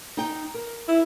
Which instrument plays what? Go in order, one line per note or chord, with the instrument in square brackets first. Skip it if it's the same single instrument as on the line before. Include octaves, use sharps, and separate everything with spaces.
[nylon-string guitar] D#4 G5
A#4
[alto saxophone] E4